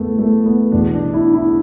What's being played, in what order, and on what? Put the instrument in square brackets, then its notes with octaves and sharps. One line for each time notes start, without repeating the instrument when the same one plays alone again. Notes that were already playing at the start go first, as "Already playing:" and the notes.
Already playing: [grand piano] E2 C#3 A3 B3
A3
B3
E2 B2 D4
D4
E4
E4